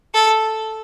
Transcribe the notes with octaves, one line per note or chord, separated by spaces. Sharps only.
A4